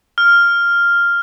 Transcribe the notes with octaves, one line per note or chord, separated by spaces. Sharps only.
F6